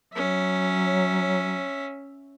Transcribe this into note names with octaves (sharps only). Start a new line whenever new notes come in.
F#3 C#4 E5